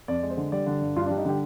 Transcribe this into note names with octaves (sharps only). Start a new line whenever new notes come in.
F2 D5
G#3
C5
D3
G3 D5
D3
G2
G2 F4
D4
G3
D#4
D3 G4